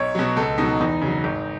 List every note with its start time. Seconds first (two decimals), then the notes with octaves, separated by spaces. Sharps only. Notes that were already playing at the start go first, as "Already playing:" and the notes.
Already playing: B1 C#5
0.15 B2 F#3
0.36 C#2 A4
0.58 B2 F#3 D#4
0.80 E2 D#4
1.02 C#3 F#3
1.24 G#1